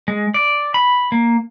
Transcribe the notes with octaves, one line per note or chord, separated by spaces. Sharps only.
G#3
D5
B5
A#3